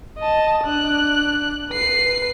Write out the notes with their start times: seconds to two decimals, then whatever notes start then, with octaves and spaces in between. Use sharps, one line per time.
0.18 D#5 A5
0.64 D4 F#6
1.71 B4 C7